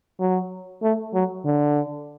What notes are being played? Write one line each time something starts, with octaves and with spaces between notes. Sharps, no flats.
F#3
A3
F#3
D3